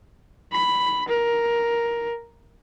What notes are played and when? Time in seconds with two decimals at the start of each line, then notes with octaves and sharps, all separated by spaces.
0.52 B5
1.09 A#4